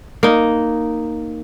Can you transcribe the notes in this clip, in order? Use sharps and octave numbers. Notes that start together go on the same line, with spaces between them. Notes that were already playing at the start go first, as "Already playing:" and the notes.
A#3 D#4